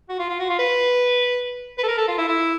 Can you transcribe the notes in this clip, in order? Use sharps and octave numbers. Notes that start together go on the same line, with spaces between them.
F#4
F4
F4
F#4
F4
B4
B4
A4
A#4
A4
F4
E4
E4